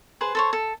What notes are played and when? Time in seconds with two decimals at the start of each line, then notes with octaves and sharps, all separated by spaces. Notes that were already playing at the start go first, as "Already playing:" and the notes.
0.21 G#4 B4 C5
0.35 A4 C5 C#5
0.53 A4